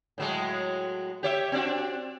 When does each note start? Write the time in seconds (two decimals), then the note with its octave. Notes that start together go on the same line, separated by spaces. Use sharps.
0.18 A2 F#3 G#3
1.23 G4 C#5 E5
1.52 C4 D4 F#4